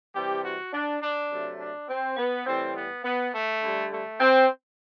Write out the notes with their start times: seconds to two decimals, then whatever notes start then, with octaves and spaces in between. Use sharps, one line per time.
0.14 C3 E3 G3 G4
0.43 F#4
0.72 D4
1.01 D4
1.30 C3 F#3 A3
1.58 D4
1.88 C4
2.17 B3
2.46 A2 E3 G3 C4
2.74 B3
3.04 B3
3.33 A3
3.62 D3 G3
3.90 A3
4.20 C4